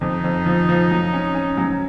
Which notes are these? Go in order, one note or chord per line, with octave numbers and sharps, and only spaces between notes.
F2 D#4
F2
F3
F3
F#3
C#4
C#4
F#3